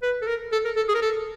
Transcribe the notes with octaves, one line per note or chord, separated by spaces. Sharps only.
B4
A4
A#4
A4
A#4
A4
G#4
A#4
A4